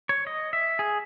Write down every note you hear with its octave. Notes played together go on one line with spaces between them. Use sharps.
C#5
D#5
E5
G#4